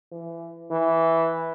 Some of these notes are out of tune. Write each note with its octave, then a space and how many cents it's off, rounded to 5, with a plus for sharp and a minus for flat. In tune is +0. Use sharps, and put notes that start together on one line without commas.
E3 +25
E3 -5